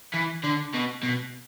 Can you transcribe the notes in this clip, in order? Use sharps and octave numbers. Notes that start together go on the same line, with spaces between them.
E3
D3
B2
B2